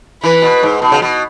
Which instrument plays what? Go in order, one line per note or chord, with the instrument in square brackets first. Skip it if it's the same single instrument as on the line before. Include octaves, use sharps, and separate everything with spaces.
[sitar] E3 [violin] B4
[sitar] B2
G#2
B2
C#3
B2